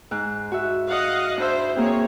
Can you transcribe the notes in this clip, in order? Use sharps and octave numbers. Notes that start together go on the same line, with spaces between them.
G#2 F#6
F#4 E5
D#5 F5 F#5
D4 E4 C5 E5
A#3 C4 G#4 C#5